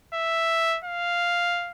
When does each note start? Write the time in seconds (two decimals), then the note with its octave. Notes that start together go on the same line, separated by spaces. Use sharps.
0.14 E5
0.84 F5